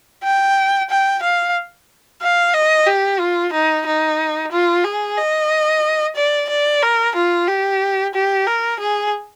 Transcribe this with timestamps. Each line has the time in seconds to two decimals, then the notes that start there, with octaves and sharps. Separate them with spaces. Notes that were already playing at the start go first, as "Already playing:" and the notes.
0.23 G5
0.90 G5
1.22 F5
2.21 F5
2.54 D#5
2.87 G4
3.19 F4
3.53 D#4
3.86 D#4
4.52 F4
4.84 G#4
5.17 D#5
6.16 D5
6.49 D5
6.82 A#4
7.15 F4
7.47 G4
8.14 G4
8.46 A#4
8.79 G#4